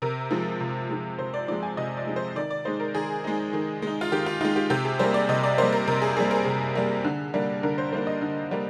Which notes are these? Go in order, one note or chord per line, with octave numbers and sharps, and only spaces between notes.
C3 A#4
F3 G#3
C3
F3 G#3
C3 C5
D5
F3 G#3 D5
G#5
C3 D#5
D5
F3 G#3
C5
D#3 D5
D5
G#3 D#4 C5
A#4
D#3 G#4
G#3 D#4
D#3
G#3 D#4
F4
D#3 G4
F4
G#3 D#4 F4
G4
C3 G4
G#4
G3 A#3 C5
D5
C3 D#5
D5
G3 A#3 C5
A#4
C3 A#4
G#4
G3 A#3 G#4
A#4
C3 G#4
G3 A#3
D3
G3 A#3 D4
D3 A#4
C5
G3 A#3 D4 C5
D#5
D3
G3 A#3